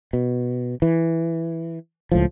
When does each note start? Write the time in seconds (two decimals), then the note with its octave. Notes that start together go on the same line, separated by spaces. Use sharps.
0.13 B2
0.82 E3
2.12 C#2 A2 F3